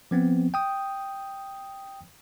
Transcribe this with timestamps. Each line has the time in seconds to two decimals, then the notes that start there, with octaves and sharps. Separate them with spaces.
0.11 F3 B3 C4
0.54 G5 D#6